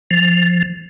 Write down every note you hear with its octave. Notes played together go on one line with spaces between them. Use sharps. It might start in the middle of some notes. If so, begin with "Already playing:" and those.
F3